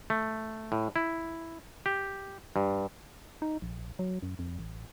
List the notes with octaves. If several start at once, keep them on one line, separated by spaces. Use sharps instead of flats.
A3
A2
E4
G4
G2
D#4
A#1
F#3
F#2
F2
A1